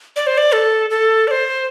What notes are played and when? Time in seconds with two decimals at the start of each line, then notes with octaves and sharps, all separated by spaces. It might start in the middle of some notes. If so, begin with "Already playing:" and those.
0.16 D5
0.27 C5
0.38 D5
0.52 A4
0.90 A4
1.27 D5
1.31 C5